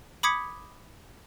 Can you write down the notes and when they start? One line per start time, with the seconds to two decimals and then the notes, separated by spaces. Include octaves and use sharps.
0.23 B5 D6 D#6 G#6 B6 C#7